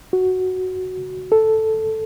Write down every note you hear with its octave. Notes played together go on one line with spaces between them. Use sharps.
F#4
A4